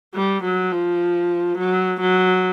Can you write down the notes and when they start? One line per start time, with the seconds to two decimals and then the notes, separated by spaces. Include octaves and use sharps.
0.15 G3
0.44 F#3
0.72 F3
1.58 F#3
2.01 F#3